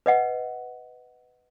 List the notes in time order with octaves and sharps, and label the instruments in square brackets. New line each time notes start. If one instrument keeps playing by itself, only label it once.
[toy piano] B4 D#5 F#5